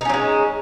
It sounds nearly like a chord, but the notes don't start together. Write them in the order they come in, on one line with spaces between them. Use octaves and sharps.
D#4 C#4 F#3 G#3